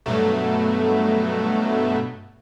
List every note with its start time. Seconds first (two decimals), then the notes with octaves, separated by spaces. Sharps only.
0.06 G2 B2 F#3 A3